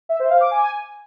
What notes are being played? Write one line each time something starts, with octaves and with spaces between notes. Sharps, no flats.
E5
C5
F5
D6
G#5